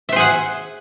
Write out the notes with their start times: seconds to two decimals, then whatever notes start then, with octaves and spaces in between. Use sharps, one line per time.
0.09 E5
0.12 C5
0.16 G#4
0.20 F#5